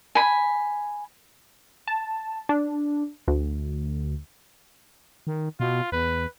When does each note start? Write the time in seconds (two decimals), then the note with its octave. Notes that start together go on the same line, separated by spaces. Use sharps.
0.15 G#5 B5
1.87 A5
2.49 D4
3.28 D2
5.27 D#3
5.60 B2 F4
5.92 E2 B4